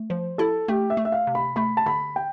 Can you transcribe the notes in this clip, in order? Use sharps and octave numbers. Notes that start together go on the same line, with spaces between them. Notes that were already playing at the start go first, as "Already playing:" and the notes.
Already playing: A3
F3 C5
E4 A4
A3 G4
E5
A3
E5
F5
C3
B5
A3 B5
A5
D3 B5
G5